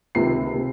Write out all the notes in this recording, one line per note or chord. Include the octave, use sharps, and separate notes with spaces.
C#2 C3 D#3 C7
C3